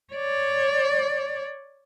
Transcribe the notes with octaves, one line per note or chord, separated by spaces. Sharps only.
C#5 D5